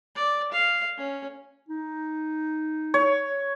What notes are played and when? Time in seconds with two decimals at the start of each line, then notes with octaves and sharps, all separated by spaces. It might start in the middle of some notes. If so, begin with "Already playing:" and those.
0.15 D5
0.52 F5
0.97 C#4
1.69 D#4
2.94 C#5